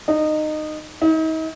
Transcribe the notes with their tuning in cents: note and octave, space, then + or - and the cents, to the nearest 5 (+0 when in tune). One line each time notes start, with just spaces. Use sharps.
D#4 -20
D#4 +40